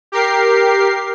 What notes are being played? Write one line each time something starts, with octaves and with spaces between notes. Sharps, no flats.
G4 A#4 C7